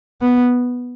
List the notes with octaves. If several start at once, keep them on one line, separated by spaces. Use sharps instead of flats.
B3